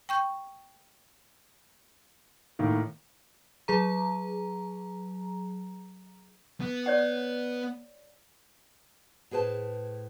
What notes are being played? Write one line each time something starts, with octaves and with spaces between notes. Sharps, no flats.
G5 C#6 G6
A2 D#3 A#3
F#3 G#4 A#5
B3
C#5 D5 F#5
A2 G#4 B4 C5 A5